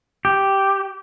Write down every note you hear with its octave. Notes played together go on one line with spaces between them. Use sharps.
G4